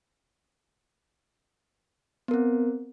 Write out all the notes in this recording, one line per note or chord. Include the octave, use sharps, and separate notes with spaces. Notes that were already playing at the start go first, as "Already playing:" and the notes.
B3 C4 A#4